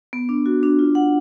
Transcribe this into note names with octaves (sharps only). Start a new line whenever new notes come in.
B3
D4
F#4
D4
F4
F#5